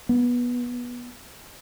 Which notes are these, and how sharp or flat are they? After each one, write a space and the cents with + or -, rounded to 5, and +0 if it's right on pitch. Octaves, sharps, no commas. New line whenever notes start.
B3 -20